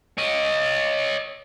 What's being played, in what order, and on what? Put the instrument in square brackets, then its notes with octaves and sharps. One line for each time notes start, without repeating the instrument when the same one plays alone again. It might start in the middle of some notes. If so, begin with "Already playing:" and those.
[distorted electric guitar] C#5 D#5